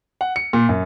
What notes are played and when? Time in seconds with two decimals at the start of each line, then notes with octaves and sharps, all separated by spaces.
0.21 F#5
0.36 C#7
0.53 A#2
0.69 F#2